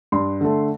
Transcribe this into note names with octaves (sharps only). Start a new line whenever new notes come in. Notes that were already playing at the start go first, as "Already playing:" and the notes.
G2 C6
D3 A3